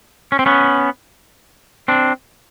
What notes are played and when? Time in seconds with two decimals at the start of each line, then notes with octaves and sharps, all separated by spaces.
0.32 C#4
0.39 C4
0.46 B3 C#4
1.88 C4 D4